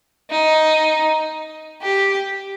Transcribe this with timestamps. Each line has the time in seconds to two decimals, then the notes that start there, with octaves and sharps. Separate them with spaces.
0.31 D#4
1.82 G4